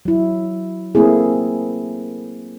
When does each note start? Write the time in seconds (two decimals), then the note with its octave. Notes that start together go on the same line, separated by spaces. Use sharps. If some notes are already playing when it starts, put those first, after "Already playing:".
0.05 F#3 E4
0.95 A3 A#3 C4 E4 G#4